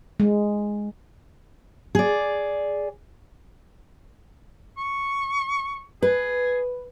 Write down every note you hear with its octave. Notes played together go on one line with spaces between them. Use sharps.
G#3
G#4 D5
C#6
G#4 B4